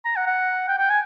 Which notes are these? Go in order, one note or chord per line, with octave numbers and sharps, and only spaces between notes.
A#5
F#5
F#5
G5
G5
G#5